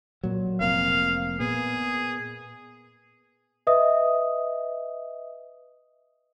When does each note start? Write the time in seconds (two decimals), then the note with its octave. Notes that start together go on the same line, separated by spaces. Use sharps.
0.23 A#2 F#3
0.60 F1 A#3 C4 F5
1.40 A#2 B3 G#4
3.67 B4 D#5 E5 D#6